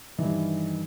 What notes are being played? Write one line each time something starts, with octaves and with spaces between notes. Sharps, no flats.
G2 D#3 E3